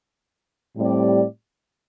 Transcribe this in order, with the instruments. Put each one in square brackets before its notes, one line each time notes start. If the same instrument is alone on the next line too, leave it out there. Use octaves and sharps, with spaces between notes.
[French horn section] A2 G3 C4 G4 D5